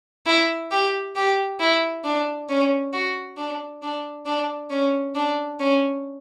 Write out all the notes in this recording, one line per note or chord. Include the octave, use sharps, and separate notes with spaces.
E4
G4
G4
E4
D4
C#4
F#4
D4
D4
D4
C#4
D4
C#4